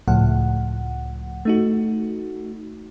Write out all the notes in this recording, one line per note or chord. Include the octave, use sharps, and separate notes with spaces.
C#2 A2 F3 F#5
A3 D#4 F#4